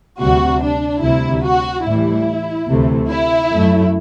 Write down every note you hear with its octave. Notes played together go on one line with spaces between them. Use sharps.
D2 C3 G3 F#4
D4
D2 C3 G3 E4
F#4
A2 E3 G3 E4
D2 C3 E3 A3
E4
F#2 F#3 A3